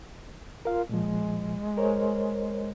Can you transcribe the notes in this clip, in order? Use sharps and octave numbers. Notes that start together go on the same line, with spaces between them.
F4 A#4 F5
A#2 F3 G#3
A#4 C5 C#5